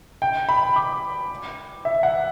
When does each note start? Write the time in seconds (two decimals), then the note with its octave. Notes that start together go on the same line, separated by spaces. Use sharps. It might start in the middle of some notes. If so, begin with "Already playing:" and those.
0.22 G5
0.49 B5
0.76 D6
1.85 E5
2.03 F#5